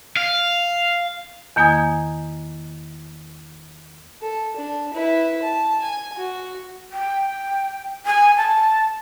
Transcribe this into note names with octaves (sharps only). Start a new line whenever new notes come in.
F5
E2 D#3 A#3 G#5 D#6 G#6
A4
D4
E4 B4
A5
G#5
F#4
G5
G#5
A5